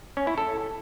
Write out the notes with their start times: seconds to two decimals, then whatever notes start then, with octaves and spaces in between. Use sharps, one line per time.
0.17 C#4
0.27 E4
0.38 A4